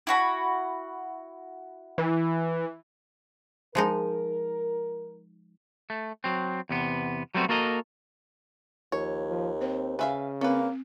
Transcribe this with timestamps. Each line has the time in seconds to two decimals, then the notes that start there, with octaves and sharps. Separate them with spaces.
0.07 E4 F#4 B5
1.98 E3
3.75 F3 G#3 D#4 A#4
5.90 A3
6.24 F#3 C4
6.69 E2 C3 B3
7.35 F#3 G3 A3 B3 C4 F#4
7.49 A#3 F#4 A4 A#4 D#5
8.92 D#2 F3 C#5
9.29 F3
9.61 C4 C5
9.99 C#3 B4 E5 F5 G#5
10.41 A#3 C4 C#4 B4